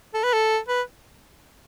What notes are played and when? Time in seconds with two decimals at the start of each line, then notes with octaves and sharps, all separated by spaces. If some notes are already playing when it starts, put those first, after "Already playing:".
0.14 A4
0.24 B4
0.33 A4
0.69 B4